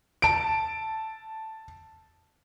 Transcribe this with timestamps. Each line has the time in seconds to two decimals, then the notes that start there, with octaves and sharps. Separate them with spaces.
0.22 A5 D7